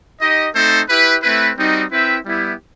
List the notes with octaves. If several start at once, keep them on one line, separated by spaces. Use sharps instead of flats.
D#4 G4 D#5
A3 C4 D#4 A4 C5
E4 G4 B4
A3 C4 E4 B4
G3 C4 D#4 F#4
C4 E4 B4 E5 G5
G3 B3 E4 G4